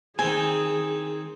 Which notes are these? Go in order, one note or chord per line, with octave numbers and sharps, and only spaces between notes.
D#3 C4 G#4 G#5